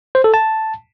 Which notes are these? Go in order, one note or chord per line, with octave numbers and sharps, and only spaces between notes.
C5
A4
A5